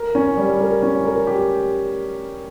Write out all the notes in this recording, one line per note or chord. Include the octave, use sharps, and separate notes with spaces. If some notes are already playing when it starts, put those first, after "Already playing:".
Already playing: A#4
C#4
G3
A#4
C#4
A#4
G4